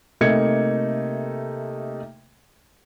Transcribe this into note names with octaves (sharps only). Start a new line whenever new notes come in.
C3 A3 A#3 D#4 G#6 C#7